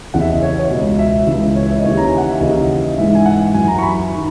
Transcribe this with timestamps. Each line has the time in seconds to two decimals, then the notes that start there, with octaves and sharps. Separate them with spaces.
0.14 E2 C#3 E3 F#5
0.21 E5
0.29 D#5
0.42 C#5
0.59 C#5
0.70 C#2 B2 D#5
0.99 E5
1.27 C#2 C#3 E3
1.56 C#5
1.70 E5
1.77 D#5
1.84 D#2 C#3 E3 C#5
1.97 A#5
2.08 G#5
2.18 F#5
2.29 E5
2.40 D#2 C#3 E3 D#5
2.83 D#5
2.98 G#2 E3 E5
3.15 G#5
3.26 F#5
3.54 F#2 E3 G#5
3.68 A#5
3.78 C#6
3.83 B5
4.14 D#3